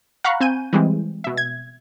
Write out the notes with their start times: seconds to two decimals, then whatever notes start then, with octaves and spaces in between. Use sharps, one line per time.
0.24 F5 F#5 A#5 B5 C#6 F#6
0.41 C4 G#5 G6 D#7
0.73 E3 G3 G#3 C4
1.24 B2 E5
1.37 G#6